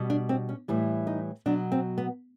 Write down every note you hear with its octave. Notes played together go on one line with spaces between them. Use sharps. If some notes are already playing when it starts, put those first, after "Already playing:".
Already playing: B2 G3
D4
C4
C#4
A2 E3 G3
D#4
B2 F#3 D4
C4
B3